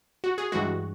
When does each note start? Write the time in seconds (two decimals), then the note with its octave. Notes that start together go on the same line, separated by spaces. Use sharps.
0.24 F#4
0.38 G#4
0.52 G2 E3 G#3 F#4